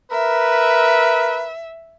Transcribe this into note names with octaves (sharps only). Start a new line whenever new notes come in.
A#4 B4 E5